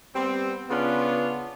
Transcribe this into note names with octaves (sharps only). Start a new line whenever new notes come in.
G3 B3 C4
C#3 B3 C#4 D4 F4